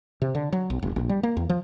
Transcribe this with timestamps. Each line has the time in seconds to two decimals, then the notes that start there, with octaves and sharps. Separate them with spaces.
0.22 C3
0.35 D3
0.53 F#3
0.70 B1
0.82 E1
0.96 A#1
1.09 G3
1.23 A#3
1.37 E2
1.49 F3